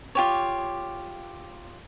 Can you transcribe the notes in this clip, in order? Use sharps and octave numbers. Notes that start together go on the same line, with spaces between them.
F4 G4 C#5